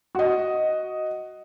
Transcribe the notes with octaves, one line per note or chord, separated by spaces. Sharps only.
F#4 D#5